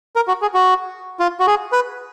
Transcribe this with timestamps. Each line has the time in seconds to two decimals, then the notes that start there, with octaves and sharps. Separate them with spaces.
0.16 A#4
0.28 F#4
0.42 G#4
0.54 F#4
1.20 F4
1.40 F#4
1.47 G#4
1.72 B4